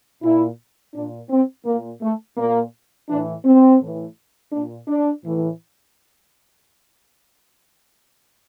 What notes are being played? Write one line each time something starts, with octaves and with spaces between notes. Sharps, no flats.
A#2 E4
A#2 D4
C4
A#2 A#3
A3
A#2 A#3
A2 E3 D4
C4
A2 E3
A#2 D4
D4
A2 E3